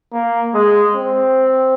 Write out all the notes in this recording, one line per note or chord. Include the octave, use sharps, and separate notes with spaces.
A#3
G#3
C4